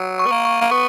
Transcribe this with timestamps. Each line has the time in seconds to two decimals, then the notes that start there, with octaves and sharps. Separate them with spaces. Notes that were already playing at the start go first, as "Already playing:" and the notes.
Already playing: F#3
0.19 C#6
0.26 B3
0.31 A#3
0.45 C#6
0.61 A#3
0.71 B3 C#6